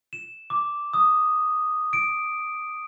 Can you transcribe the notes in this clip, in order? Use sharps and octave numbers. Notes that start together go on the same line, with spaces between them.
E7
D6
D#6
D7